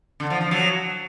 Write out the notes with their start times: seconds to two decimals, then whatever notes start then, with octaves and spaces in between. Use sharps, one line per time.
0.20 D3
0.30 F3
0.41 F3
0.51 F#3